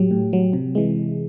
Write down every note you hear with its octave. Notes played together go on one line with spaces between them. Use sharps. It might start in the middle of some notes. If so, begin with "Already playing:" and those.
Already playing: A2 F#3 G4
A2
F#3
C3
E3 G#3